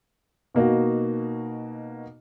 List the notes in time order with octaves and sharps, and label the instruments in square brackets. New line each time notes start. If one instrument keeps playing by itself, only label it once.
[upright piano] B2 A#3 D#4 F#4